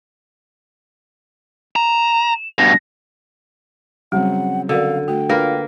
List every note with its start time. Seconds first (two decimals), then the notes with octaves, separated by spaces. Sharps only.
1.76 A#5 E7
2.58 G2 B2 A#6
4.12 C#3 F#3 G3 C4 F#5
4.69 D3 F#4 A#4 D5 F5
5.08 A3 F#4 G5
5.29 A#3 D4 F4 A#4 B4